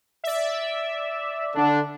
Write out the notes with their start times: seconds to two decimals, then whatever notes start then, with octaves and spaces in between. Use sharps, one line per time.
0.24 D5 E5
1.55 D3 D4